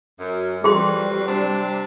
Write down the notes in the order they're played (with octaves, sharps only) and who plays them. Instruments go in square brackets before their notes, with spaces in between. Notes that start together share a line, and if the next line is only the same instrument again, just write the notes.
[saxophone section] F#2
[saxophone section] F2 F#4 B4 [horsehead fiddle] G3 [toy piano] G#4 C6
[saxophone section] C3 C4 D4